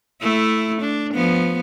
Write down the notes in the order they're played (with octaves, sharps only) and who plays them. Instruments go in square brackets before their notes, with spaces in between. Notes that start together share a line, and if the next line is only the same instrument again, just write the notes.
[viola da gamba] A3 E4
D4
F3 B3